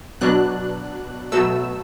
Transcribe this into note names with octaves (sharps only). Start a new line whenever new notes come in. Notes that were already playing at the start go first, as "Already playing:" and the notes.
B2 F#3 D4 F#6
B2 F#3 A3 E6